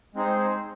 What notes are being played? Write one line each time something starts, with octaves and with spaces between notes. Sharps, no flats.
G#3 C4 D#4 G#4 C5